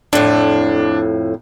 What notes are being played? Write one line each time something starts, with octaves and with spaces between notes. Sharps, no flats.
F2 A2 D4